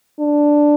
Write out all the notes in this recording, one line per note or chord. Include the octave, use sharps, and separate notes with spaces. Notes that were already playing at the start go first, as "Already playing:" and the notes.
D4